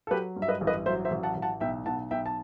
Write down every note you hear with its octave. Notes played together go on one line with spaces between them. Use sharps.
A4
F#3 G4 B4
G2
E5
B4 D#5
A1
B4 D#5
F#3 C5 E5
C5 E5
A1
F#5 A5
A1
F#5 A5
B1 E5 G5
B1 F#5 A5
B1 E5 G5
A5